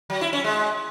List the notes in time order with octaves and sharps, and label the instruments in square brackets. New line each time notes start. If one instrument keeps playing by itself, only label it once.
[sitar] F#3
E4
C#4
G#3